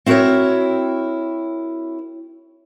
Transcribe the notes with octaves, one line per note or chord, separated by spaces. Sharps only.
C4 E4 F#4 G#4 A#4 C#5